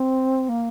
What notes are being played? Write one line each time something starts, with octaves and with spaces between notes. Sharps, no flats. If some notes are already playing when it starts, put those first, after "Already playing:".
Already playing: C4
A#3